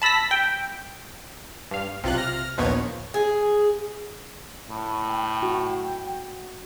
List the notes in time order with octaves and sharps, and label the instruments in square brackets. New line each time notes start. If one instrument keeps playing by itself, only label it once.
[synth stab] A5 B5 E6 A#6 B6
G5
G2 F5
[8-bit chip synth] B1 F4 F#6 [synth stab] C3
[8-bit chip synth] F6 A#6
[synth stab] A#1 D#2 A#2 [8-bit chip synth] F3 B3 C#5
[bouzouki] G#4
[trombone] A2
[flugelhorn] G5
[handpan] F#4